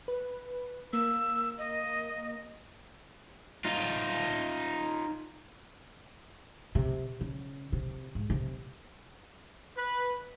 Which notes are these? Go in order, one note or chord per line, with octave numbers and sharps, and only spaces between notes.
B4
A#3 E6
D#5
D#4 F4
C3
C#3
C3
G#2
C3
B4